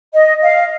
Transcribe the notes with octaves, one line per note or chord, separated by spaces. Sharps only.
D#5
F5